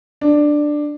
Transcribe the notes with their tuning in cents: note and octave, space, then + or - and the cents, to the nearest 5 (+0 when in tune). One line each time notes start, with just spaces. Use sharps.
D4 +10